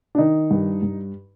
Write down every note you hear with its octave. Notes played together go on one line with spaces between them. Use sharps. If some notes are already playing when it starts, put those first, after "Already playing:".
D4
D#3 D#4
G2
G2